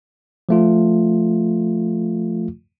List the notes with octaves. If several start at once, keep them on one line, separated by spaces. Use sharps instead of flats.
F3 A3 F4